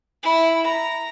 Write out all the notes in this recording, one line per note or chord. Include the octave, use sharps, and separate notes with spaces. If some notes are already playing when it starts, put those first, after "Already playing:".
E4
A#5